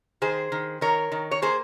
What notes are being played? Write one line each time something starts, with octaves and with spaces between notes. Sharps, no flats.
D#3 G#4 C5
D#3
D#3 A#4 C#5
D#3
C#5
A#3 G#4 C5